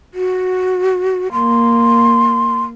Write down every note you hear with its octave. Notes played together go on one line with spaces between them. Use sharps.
F#4
A#3 C6